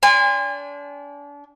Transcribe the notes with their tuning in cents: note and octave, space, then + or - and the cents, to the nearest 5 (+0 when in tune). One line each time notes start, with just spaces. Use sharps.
D4 -35 G#5 -40 C6 -15